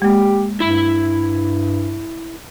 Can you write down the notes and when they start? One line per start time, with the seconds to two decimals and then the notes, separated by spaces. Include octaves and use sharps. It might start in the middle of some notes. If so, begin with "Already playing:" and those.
0.02 G#3 A#3 G4
0.60 G2 E4 B5